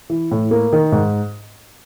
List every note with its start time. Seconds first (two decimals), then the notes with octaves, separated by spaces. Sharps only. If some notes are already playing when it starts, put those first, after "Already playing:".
0.10 E3
0.31 A2
0.51 A#3
0.73 D#3
0.92 G#2